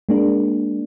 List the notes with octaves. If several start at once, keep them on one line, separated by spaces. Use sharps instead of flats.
G#3 A#3 D4